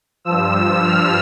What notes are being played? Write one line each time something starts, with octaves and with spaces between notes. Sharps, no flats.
G2 F3 E6
F6